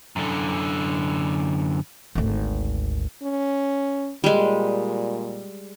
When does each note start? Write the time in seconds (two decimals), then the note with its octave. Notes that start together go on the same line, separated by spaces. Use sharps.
0.16 F#2 D3
2.15 G#1 D2
3.23 C#4
4.24 A#2 G3 G#3